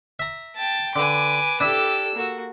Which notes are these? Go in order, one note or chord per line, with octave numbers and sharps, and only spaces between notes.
E5 A#5
G5 A5
D3 B4 G#5 D6
D4 E4 G4 A4 E6
A#3 F#4